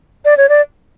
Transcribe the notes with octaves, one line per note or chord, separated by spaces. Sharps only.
D5
C#5
D5